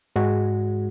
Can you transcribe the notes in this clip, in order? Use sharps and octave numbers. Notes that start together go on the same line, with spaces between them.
G#2 G#3 F#4